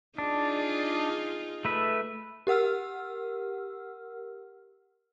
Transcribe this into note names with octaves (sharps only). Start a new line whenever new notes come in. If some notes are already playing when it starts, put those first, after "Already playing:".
D4 D#4 F4 G#4
A3 B4 E5
G4 A#4 F#5 E6 F6